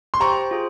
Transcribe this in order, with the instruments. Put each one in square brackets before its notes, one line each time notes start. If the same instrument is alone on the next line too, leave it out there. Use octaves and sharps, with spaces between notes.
[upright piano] C6
[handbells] G4 C5 G5 [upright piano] A#5 C#6
[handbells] F4 G#4 C5